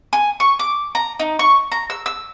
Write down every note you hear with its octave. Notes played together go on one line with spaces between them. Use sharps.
G#5
C#6
D6
A#5
D#4
C#6
A#5
E6
E6